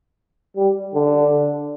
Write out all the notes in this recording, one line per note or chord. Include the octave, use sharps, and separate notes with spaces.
G3
D3